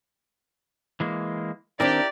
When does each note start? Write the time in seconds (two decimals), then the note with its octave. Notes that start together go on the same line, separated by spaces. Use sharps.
1.00 E3 G#3 A#3
1.80 D#3 C4 D4 E4 G4 A#4 D5